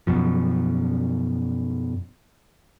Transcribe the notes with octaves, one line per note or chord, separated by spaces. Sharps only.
F#2 B2 F3